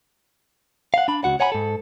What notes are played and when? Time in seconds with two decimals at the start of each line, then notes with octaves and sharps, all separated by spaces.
0.94 F5 F#5
1.08 D4 B5
1.24 C#2 F#4 F#5
1.40 C#5 F#5 G#5 A#5 B5
1.52 G#2 A4